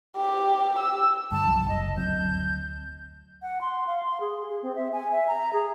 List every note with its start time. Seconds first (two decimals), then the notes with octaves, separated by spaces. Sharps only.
0.17 G4
0.79 E6
1.32 G2 D3 G3 A5
1.45 C2 F3 F#3
1.69 F#1 D#5
1.97 D2 F#3 C4 G6
3.42 F#5
3.61 C6
3.87 F5
4.03 C6
4.20 G#4
4.50 G#4
4.63 C4
4.76 E5
4.92 G#5
5.12 E5
5.27 A#5
5.53 G#4